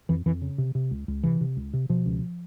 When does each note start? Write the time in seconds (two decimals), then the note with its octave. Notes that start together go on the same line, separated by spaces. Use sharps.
0.09 F2 E3
0.26 F2 E3
0.42 C#3
0.58 C3
0.75 C3
0.91 C#2
1.08 C#2
1.23 C3 E3
1.41 C3
1.57 C#2
1.73 C3
1.89 B2 F3
2.06 C#2